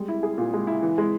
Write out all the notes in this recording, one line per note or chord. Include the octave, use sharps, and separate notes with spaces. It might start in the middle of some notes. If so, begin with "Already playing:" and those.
Already playing: G3 G#3
E4
G#4
A#2
G#3
E4
E3
G#3